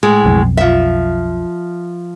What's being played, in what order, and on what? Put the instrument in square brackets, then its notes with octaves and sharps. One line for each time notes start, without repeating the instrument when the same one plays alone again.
[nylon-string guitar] A2 G#3 G#4
[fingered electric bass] B1 F2
[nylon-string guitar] F3 E5